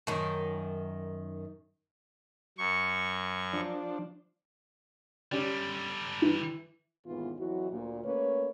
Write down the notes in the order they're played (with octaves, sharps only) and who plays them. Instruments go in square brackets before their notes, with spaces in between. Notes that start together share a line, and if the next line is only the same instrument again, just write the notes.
[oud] F#2 D#3
[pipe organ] F#2 C#6
[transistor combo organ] F3 D4
[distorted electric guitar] D3 G3 [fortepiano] C#4 G4 D5
[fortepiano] E3
[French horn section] D#2 G#2 B2 E3 B3 F4
F2 E3 F#3 E4 F#4
D2 A#2
A3 A#3 C#4 B4 C#5